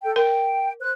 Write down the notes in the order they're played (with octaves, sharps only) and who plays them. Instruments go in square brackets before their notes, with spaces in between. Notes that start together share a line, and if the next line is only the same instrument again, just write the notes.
[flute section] A4 G5
[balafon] A#4 [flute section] G5
[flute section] C5 F#6